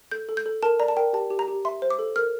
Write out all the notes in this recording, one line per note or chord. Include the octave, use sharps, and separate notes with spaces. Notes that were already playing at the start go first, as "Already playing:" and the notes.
A4 G6
A4
G6
A4
A#4 A5
D5 A#5
A5
A#4 G5
G4 A5
G4
A#5
G4
E5 C6
C5
D6
A4
A#4 F6